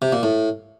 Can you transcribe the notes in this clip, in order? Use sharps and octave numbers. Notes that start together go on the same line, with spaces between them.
C3
A#2
A2